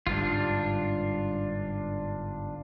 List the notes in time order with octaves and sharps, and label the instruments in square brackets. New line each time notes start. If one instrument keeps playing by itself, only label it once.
[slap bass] G1 G#2 G3 [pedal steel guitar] D4 F4